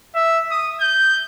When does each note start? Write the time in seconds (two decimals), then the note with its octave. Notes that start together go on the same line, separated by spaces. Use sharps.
0.15 E5
0.51 D#6
0.80 G6